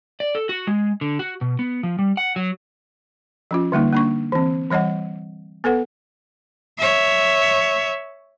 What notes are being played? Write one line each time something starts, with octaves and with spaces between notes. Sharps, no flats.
D5
A4
F#4
G#3
D3
F#4
B2
B3
F3
G3
F#5
F#3
F3 C#4 F4
D3 G3 A#3 D#4
A#3 D4 C#6
E3 C4
E3 G3 C#5 D#5 F#5
B3 A4 B4 F#5
C#5 E5